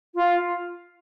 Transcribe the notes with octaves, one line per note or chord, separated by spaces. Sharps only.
F4